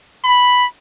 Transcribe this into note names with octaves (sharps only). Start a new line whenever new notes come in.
B5